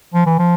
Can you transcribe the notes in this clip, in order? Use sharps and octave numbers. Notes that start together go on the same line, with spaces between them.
F3
E3
F3